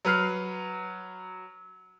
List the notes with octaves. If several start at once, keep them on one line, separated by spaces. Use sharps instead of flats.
F#3 B4 F6 C7